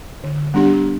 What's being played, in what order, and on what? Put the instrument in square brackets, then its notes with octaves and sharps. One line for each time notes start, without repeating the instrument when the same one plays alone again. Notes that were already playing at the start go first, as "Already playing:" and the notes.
[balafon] D3
G3 B3 D4 G4